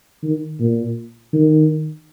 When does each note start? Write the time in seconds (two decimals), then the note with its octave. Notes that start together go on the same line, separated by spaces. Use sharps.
0.23 D#3
0.59 A#2
1.33 D#3